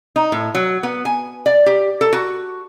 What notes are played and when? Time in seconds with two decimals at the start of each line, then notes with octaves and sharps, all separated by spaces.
0.16 D#4
0.32 A2
0.55 F#3
0.83 B3
1.05 G#5
1.46 D5
1.66 G4
2.01 A4
2.13 F#4